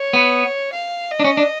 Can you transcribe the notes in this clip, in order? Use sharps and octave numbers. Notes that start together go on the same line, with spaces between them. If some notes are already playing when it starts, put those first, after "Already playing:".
Already playing: C#5
B3
F5
D#5
D4
C#4
D4